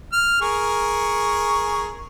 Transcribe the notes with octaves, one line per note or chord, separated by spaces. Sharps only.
F6
G#4 A#4 C#6